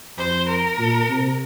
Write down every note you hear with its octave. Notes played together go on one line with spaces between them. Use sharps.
F2 C5
A#4
A#2
C3